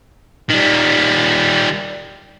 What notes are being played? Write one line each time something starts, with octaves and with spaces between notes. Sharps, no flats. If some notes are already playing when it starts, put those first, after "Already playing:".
D#3 G3